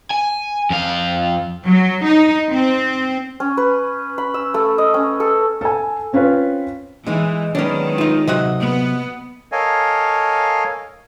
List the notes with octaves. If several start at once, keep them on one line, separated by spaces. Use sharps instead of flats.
G#5
F2 F5
F#3
D#4
C4
C#4
B4
B5
E6
A3
D#5
C#4
A4
A4 G#5
C4 C#4 F4 B4
E3 G#3 D#4
D#3 F#3 G#3 B3 C#4 D4
D#4 F4
C3 F#3 D#5 F#5
B3
A4 A#4 C#5 D#5 F5 G#5